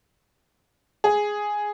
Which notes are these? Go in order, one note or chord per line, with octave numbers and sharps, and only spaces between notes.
G#4